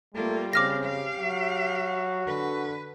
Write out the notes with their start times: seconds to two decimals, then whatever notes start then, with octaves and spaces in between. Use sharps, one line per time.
0.15 G3 A3 A#3 F4
0.53 C#3 C4 F5 D6 F6 A#6
0.85 G4 F5
1.19 F#3 F#4
2.27 D3 B4